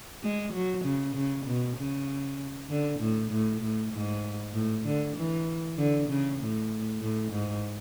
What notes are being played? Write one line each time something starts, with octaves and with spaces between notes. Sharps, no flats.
G#3
F#3
C#3
C#3
B2
C#3
D3
A2
A2
A2
G#2
A2
D3
E3
D3
C#3
A2
A2
G#2